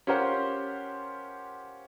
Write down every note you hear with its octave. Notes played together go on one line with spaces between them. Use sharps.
C#4 F4 G4 A#4 C5 F#5